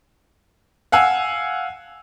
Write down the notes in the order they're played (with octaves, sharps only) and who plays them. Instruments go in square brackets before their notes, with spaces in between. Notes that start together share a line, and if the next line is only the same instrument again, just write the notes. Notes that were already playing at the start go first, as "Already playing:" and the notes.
[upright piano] F5 F#5 G#5 E6